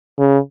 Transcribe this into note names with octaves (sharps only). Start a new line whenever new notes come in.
C#3